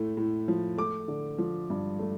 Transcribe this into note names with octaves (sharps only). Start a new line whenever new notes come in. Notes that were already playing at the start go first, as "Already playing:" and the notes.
Already playing: A2 A3
A2
F3
A3 D6
D3
F3
G2
A3